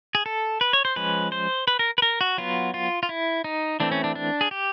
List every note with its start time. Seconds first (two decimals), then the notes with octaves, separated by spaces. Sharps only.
0.15 G#4
0.26 A4
0.61 B4
0.73 C#5
0.85 C5
0.96 F3 G#3 C#4 B4
1.32 C5
1.68 B4
1.79 A#4
1.98 B4
2.02 A#4
2.21 F#4
2.38 F#3 B3 F4
2.74 F4
3.03 F4
3.09 E4
3.44 D#4
3.80 E3 A3 C4 D4
3.92 C#4
4.04 D4
4.15 D4
4.41 G#4
4.51 G4